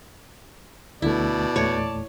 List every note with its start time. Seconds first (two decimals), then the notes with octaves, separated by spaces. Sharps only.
1.02 D2 B2 D3 A3 E4 D5 A5
1.56 E2 A#2 A3 C#5